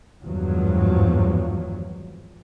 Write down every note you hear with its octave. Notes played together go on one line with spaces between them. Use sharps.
G#1 E2 G2 F3 F#3